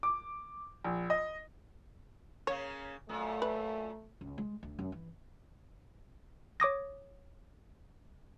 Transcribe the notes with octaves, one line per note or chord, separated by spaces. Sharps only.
D6
A#1
D#5
C#3 A#3 C#4 C#5
F#2 A#2 A3
B4
C#2
G#3
D2
F#2
E3
C#5 D6 D#6 A#6